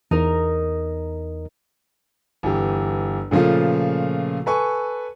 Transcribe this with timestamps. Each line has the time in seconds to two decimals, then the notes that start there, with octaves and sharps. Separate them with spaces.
0.11 E2 D#4 A#4
2.43 G1 E3 G4
3.31 A#2 C#3 F3 A3 F4
4.46 A4 B4 G#5 C#6